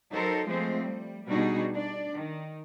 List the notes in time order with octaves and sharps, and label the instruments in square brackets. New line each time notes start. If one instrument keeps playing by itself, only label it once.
[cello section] F#3 D#4 A4 A#4 C5
F3 G#3 A3 C4 C5
G3
B2 G3 D4 D#4 F#4 G#4
D4 D5
D#3